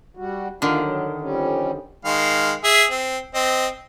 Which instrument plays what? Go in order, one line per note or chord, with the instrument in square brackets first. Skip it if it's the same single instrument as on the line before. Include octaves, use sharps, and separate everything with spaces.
[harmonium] G3 F#4
[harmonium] D#2 F4 F5 [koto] D3 D#3
[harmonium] F#3
F2 G3 C#4
[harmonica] D#3 G#3 F5
G#4 E5
C4
C4 D#5